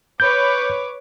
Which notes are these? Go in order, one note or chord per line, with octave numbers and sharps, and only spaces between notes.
B4 C#5 D6 G6